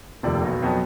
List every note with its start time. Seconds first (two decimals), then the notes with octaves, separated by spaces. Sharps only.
0.23 F1 D#2 C3 F3 A4 D5
0.42 B1 B3 F#4
0.62 F2 F#3 B3 G5 A5 D#6